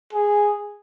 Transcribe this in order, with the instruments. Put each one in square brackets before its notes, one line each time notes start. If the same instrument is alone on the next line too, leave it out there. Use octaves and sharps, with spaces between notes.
[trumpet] G#4